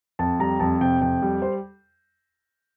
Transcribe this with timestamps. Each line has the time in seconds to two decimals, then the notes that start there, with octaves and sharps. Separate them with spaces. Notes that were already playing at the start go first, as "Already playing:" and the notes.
0.19 F2 A5
0.39 G3 A#5
0.59 F2 A5
0.81 C3 G5
1.01 F2 G5
1.22 G3
1.42 C5